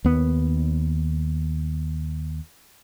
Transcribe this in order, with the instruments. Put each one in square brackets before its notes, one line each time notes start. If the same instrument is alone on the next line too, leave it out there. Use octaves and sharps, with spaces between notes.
[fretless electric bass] D#2 B3